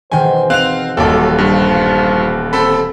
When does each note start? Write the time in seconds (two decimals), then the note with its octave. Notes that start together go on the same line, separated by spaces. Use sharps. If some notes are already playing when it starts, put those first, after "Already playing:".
0.12 E1 D#3 C5 G5 G#5
0.50 C4 F5 F#6 F7
0.97 D#1 D#2 F#3 A4 A5 D6
1.38 G2 F3
2.53 C4 A4 B5 E6